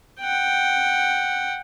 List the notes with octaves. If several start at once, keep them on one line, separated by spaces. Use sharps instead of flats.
F#5 G5